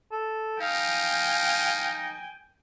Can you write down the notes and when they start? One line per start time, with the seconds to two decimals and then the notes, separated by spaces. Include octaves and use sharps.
0.12 A4
0.61 D#4 F5 G5 G#5